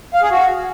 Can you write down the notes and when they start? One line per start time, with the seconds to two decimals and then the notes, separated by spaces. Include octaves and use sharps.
0.14 F5
0.23 G#4
0.31 F#4